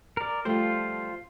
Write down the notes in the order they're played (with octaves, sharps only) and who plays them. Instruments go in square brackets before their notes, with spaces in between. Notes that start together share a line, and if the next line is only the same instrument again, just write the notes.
[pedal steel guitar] A#4 D5
[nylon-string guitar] F3 G3 A3 [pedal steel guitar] F4 C5